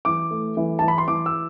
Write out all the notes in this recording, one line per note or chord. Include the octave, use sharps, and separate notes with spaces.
E3 D6
A3
E3
E3 A5
B5
C6
E3 D6
E6